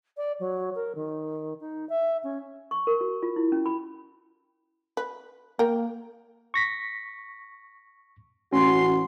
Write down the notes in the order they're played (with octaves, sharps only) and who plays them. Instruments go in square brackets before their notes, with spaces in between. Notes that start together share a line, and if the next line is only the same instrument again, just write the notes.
[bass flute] D5
F#3
A#4
D#3
D#4
E5
C#4
[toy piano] C#6
A#4
F#4
F4
E4
C#4
B5
[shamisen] B4
[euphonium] A#3 [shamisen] A#4 G5
[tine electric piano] C#6 A#6 B6
[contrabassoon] A1 [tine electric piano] C#4 [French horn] F#4 [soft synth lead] C6